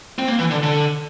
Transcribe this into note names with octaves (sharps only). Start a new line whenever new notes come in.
C4
A#3
E3
D3
D3